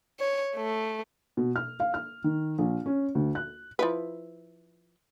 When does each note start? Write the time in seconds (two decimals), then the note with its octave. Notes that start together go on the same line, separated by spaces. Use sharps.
0.20 C#5
0.56 A3
1.37 B2
1.56 F6
1.80 F5
1.94 F6
2.24 D#3
2.58 A#1
2.86 C#4
3.15 D2
3.35 F#6
3.79 F3 E4 B4